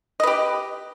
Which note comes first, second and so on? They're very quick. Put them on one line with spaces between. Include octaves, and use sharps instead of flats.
D#5 B4 G4